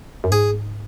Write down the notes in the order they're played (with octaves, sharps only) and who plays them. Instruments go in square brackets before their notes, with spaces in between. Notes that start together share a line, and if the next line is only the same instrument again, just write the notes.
[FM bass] F#2
[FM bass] G#2 [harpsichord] G#4